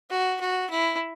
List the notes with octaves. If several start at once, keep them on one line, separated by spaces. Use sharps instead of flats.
F#4
F#4
E4